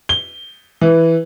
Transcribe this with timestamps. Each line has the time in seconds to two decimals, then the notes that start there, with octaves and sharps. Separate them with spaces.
0.09 G7
0.81 E3